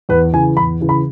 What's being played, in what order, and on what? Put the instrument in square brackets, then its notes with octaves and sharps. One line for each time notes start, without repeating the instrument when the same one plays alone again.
[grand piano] E2 B4
C#3 E3 G#5
E2 B5
C#3 E3
B5